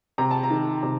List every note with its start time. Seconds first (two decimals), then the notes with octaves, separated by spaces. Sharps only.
0.18 C3 A#5
0.31 A5
0.43 A#5
0.50 D#3
0.83 C3